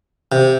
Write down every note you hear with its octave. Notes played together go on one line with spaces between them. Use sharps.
C3